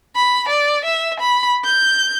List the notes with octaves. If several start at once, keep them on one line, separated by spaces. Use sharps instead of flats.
B5
D5
E5
B5
G6